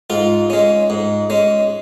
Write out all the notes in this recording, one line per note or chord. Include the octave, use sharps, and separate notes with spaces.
G#2 F4
G#3 C#4
G#2
G#3 C#4